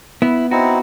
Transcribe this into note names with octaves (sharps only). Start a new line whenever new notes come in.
B3 E4
C4 D#4 E4 F#4